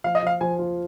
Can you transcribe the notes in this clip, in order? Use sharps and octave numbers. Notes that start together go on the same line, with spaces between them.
F3 F5
D#5
F3 F5
F3 G#5
F4